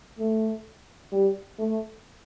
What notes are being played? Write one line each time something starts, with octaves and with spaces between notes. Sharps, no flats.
A3
G3
A3